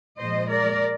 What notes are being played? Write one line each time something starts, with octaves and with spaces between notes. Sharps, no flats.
A#2 F3 G#3 C5 D#5
A#4 D5